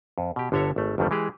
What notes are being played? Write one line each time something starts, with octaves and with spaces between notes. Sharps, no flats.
F2
B2 G4
G1 D3 A4 C#5 E5 A#5
G#1 A3
G1 F2 D#3 G3 A3
E3 G#3 G4 G#4